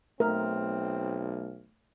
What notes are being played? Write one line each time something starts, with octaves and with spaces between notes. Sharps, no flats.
B1 A3 C4 A#4 F6